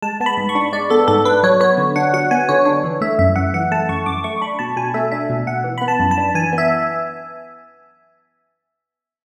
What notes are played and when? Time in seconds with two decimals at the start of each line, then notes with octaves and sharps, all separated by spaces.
0.02 G#3 A5
0.20 B3 A5
0.26 B5
0.38 G#2
0.49 C#6
0.55 D4
0.73 G#3 D5
0.90 B3 A4
1.08 G#2 A4
1.25 D4 B4
1.43 F#3 C#5
1.60 B3 C#5
1.78 D3
1.96 D4 F#5
2.13 F#3 F#5
2.31 B3 G#5
2.49 D3 C#5
2.65 D4 C#5
2.84 E3
3.01 A3 E5
3.19 F#2 E5
3.36 F#2 F#5
3.54 E3 F#5
3.71 A3 A5
3.89 F#2 C#6
4.06 F#2 D6
4.24 A3 C#6
4.41 D4 B5
4.59 B2 A5
4.77 B2 G#5
4.94 A3 E5
5.12 D4 E5
5.30 B2
5.47 B2 F#5
5.64 E3
5.78 B3 B5
5.88 A5
6.00 F#2
6.11 A5
6.18 D4
6.35 E3 G#5
6.53 B3
6.58 E5